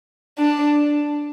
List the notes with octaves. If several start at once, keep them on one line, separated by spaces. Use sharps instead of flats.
D4